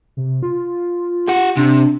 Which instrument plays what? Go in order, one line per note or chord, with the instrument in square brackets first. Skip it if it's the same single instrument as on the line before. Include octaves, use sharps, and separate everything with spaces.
[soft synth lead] C3
F4
[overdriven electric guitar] G4 F#5
[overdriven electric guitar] C3 [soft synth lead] D4